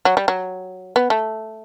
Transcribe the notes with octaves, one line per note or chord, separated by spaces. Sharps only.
F#3
G3
F#3
B3
A3